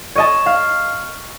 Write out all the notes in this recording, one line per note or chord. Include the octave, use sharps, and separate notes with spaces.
C#5 D#5 A5
F5